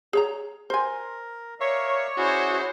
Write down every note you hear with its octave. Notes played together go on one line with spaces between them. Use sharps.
G#4 C#5 A#5
A#4 C5 G#5
A#4 C#5 D5 E5 F5
C#4 E4 F#4 G#4 C5